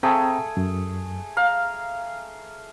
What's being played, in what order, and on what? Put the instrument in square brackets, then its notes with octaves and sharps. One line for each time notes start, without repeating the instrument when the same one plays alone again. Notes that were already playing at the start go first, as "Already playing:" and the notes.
[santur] A3 G#4 [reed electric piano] C4 G5 A#5
[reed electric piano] F#2
[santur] F5 [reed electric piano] A#5